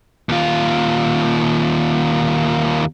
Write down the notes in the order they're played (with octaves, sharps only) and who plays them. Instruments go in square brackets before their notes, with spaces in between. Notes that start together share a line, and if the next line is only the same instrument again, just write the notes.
[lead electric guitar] D#2 F4